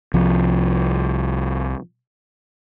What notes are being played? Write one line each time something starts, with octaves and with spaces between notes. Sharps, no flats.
C2 F3